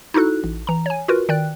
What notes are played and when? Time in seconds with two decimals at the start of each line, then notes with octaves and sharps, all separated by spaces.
0.14 D#4 E4 F#4 A4 F#6
0.44 A1
0.67 E3 A#5
0.86 C#5 G#5
1.08 F4 F#4 A#4 B4
1.29 D#3 D5 G5 F#6